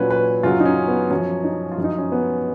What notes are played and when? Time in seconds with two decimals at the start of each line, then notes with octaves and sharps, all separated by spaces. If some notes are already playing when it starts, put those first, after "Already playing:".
Already playing: A#2 F#3 C#4 B4
0.10 B4
0.43 F#2 C#3 F#3 F4
0.60 D#4
0.65 C#4
0.88 B3
1.10 F#2 F3 C#4
1.44 D#4
1.72 F4
1.78 F#2 F3
1.84 D#4
1.98 C#4
2.12 B3